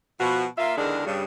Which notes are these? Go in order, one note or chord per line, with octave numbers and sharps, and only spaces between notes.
B2 F3 F#4
A#3 F4 E5
E2 D3 D#3 G#3 D4 A#4
G2 C#3 G3